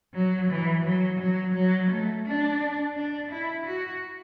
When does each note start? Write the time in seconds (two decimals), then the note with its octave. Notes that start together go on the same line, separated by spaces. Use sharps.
0.14 F#3
0.50 E3
0.84 F#3
1.19 F#3
1.54 F#3
1.90 A3
2.25 D4
2.95 D4
3.31 E4
3.65 F#4